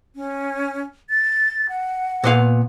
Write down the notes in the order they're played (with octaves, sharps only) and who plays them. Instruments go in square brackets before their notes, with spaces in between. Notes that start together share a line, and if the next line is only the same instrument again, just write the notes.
[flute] C#4
A6
F#5
[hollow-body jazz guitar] A#2 B3 F5